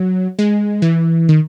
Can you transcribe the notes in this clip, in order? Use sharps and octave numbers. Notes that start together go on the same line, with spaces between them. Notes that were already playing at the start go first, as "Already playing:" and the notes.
Already playing: F#3
G#3
E3
D#3